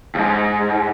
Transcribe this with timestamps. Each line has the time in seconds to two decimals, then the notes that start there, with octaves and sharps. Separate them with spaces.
0.15 C#2 G#2